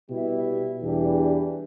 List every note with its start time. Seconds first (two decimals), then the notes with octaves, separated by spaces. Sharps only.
0.09 B2 G3 E4 G4 E5
0.82 E2 E3 G3 D4 G4